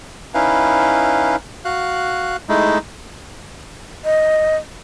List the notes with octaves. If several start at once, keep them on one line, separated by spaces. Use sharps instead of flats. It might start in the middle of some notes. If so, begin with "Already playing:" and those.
C#4 D#4 E4 B4 F5
F#4 F5 F#6
G#3 A3 D#4 E4
D#5